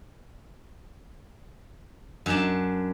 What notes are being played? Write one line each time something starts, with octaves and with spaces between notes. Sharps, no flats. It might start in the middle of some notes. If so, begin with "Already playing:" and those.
F#2 D4 A5